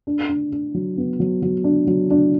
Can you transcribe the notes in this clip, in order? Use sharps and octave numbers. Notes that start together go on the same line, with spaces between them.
D4
D4
D4
F#3
B3
F#3
F#3
D4
F#3
D4